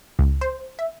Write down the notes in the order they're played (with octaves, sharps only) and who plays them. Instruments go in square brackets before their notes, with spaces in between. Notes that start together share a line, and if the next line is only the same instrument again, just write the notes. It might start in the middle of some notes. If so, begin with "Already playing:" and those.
[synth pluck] C#2
C5
E5